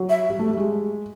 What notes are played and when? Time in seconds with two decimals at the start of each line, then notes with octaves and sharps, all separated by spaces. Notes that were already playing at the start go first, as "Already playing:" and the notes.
Already playing: F#3
0.10 E5
0.30 G3
0.39 A3
0.48 G3
0.57 G#3